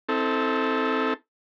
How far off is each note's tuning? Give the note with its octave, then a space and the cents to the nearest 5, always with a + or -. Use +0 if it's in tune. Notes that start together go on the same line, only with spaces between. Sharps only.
C4 +0 E4 -45 A4 +0